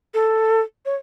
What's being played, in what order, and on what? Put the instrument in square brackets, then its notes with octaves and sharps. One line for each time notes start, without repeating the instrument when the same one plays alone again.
[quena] A4
C#5